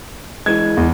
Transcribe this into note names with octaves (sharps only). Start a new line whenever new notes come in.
E3 G#3 G#6
E2